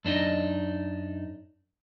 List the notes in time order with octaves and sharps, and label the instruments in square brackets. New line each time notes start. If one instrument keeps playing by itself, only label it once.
[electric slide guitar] F#2 D4 D#4 D#5